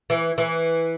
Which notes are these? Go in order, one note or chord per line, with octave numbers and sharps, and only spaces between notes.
E3
E3